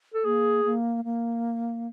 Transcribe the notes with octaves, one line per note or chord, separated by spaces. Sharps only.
A4
A#3 G#4
A#3
A#3